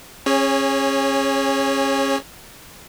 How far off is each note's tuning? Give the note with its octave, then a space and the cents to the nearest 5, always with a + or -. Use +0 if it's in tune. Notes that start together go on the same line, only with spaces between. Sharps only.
C#4 -30 G#4 -15 C#5 +0